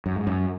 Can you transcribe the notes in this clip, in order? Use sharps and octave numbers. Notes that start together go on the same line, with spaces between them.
F#2
G#2
F#2